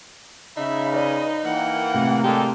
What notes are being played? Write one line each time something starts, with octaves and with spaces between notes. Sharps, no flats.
C#3 D#4 E5 B5
B4 D5 D#5
E3 A#3 F#5 G5
A2 C3
G#3 A#3 D4 G4 A4 G5